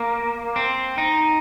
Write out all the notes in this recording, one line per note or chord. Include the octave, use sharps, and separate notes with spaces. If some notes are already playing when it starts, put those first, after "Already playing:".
Already playing: A#3
C4
D#4